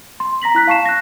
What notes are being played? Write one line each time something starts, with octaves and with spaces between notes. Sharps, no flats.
C6
A#5 A#6 B6 F#7
E4 F#6 B6
F5 A5 C#6 C7 E7
F#6 A#6